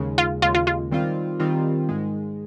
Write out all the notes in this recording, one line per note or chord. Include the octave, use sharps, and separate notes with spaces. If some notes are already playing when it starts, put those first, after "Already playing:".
Already playing: D#2 C#3 G#3
F4
D#2 C#3 G#3 F4
F4
F4
D#3 G3 C4 F4
D#3 G3 C4 F4
G#2 D#3 G#3